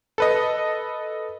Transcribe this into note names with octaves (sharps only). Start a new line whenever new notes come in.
A4 B4 D#5